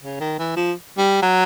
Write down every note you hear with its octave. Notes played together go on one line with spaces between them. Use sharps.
C#3
D#3
E3
F3
G3
F#3